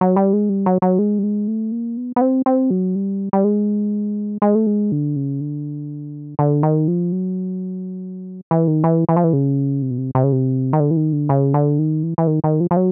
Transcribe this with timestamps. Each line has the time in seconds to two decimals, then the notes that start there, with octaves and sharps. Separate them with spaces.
0.01 F#3
0.16 G3
0.33 G#3
0.49 G3
0.66 F#3
0.82 F#3
0.99 G#3
1.19 G3
1.23 G#3
1.48 A3
1.72 A#3
1.97 B3
2.16 B3
2.21 C4
2.46 C4
2.70 F#3
2.95 G3
3.33 G3
3.44 G#3
4.42 G#3
4.55 A3
4.67 G#3
4.92 D3
5.16 C#3
5.41 D3
6.39 D3
6.63 D#3
6.88 F3
7.12 F#3
8.51 E3
8.67 D#3
8.84 E3
9.09 E3
9.17 F3
9.24 E3
9.33 C#3
9.82 C3
9.90 B2
9.98 C3
10.15 C3
10.24 C#3
10.32 C3
10.73 D#3
10.80 D3
10.91 E3
10.97 D#3
11.13 D3
11.29 C#3
11.54 D3
11.79 D#3
12.03 E3
12.18 E3
12.27 D#3
12.44 D#3
12.60 F3
12.71 F3
12.77 F#3